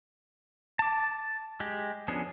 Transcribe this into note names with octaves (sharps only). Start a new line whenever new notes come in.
A5 D6
G#3 G4
F3 B3 C#4 D4 G#4